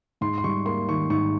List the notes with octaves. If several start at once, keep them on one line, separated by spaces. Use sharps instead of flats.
G#2 C6
C6
G3 C#6
A#3 C6
D#3 C#6
G#2 C#6